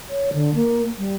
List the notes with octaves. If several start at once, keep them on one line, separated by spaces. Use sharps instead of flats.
C#5
D3
A#3
G3